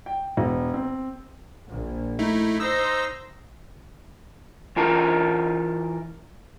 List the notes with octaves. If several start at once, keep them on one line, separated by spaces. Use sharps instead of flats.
G5
E1
C4
A#1
A3 D#4 E4
D#4 C5 E6 A#6
E3 F4 A#4 A#5